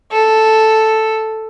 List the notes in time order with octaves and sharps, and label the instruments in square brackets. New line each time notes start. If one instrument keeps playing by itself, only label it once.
[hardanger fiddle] A4